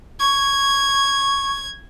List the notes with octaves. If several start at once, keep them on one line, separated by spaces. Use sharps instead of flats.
C#6 G#6